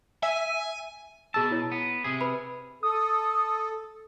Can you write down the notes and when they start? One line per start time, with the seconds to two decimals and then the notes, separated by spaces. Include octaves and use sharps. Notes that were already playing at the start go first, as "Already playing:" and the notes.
0.23 E5 G#5
1.34 B2 G#4 A5 E6
1.51 E4 C#5
1.72 B3
2.04 C3 G#4
2.21 B4 B5
2.83 A4 D#6